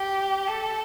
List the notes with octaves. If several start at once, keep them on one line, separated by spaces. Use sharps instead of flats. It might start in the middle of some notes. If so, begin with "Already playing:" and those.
Already playing: G4
A4